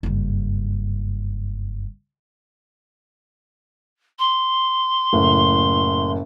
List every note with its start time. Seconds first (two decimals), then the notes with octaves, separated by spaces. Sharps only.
0.03 F#1 G2
4.19 C6
5.13 F#1 A2